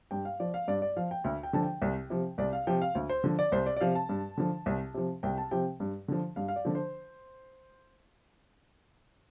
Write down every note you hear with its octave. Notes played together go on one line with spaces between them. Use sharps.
G2 G5
F5
F3 D5
F5
G2 D5
D5
F3 F5
G5
D2
G5
D3 F3 A5
G5
C2
C3 F3
C2 D5
F5
C3 F3 G5
F5
D2
C5
D3 F3
D5
C2 C5
D5
D5
C3 F3 F5
A5
G2
D3 F3
C2
C3 F3
C2 G5
A5
C3 F3 G5
G2
D3 F3
G2 F5
F5
D5
D3 F3
C5